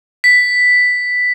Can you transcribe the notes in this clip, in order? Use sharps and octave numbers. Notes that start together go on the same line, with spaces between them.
B6